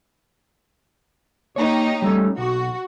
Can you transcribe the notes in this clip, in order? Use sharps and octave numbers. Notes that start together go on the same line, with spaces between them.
A#3 D#4 G4 C#5
G3 A3 C#4
B1 F#4